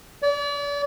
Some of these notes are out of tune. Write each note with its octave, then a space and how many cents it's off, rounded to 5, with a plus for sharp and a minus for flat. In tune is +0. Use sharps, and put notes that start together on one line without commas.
D5 -40